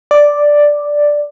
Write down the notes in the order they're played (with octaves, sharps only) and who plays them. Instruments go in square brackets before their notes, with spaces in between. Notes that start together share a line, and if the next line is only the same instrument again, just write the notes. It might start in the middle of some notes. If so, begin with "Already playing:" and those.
[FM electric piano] D5